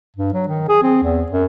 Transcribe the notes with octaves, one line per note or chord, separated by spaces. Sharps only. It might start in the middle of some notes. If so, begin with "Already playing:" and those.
G2
F#3
D#3
G#4
C4
E2
F#2